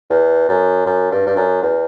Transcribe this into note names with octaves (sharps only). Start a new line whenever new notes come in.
E2
F#2
F#2
G2
G2
F#2
E2